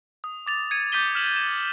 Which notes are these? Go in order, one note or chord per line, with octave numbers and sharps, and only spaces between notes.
D#6
D6 A6 F7
G#6 C#7 D#7
D6 G6 A6 B6 D#7 G7
F6 B6 E7 F#7
A6 E7